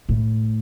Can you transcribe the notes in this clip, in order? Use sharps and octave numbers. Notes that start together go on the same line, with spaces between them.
A2